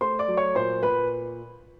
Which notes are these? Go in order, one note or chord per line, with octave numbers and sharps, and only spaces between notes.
A3 C5 C6
D5 D6
F#3
C#5 C#6
A#2 C5 C6
A#2 B4 B5